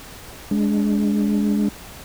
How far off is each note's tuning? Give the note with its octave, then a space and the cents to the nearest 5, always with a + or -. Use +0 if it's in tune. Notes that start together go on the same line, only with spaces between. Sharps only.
G#3 +0 D4 -25